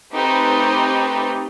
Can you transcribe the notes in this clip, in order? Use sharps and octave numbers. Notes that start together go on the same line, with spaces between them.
A3 C4 D#4 G4 B4